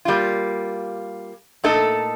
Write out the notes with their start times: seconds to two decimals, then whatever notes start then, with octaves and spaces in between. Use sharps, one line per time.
0.05 G3 A#3 F4
1.64 A#2 A3 D#4 A4